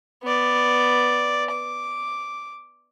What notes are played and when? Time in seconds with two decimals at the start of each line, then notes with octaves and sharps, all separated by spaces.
0.23 B3 D5
1.50 D6